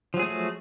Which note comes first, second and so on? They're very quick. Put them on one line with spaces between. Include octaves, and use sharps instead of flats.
F3 F#3 G#4 A3 F#4